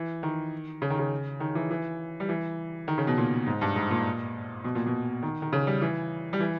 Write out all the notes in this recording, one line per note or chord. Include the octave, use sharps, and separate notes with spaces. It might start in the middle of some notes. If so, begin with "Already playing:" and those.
Already playing: E3
D#3
C#3
D#3
C#3
D#3
E3
E3
G3
E3
D#3
C#3
B2
A#2
G#2
G2
G#2
A#2
B2
A#2
B2
D#3
D#3
C#3
G3
E3
G3
E3